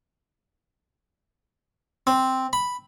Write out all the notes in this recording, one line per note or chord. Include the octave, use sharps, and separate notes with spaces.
C4
B5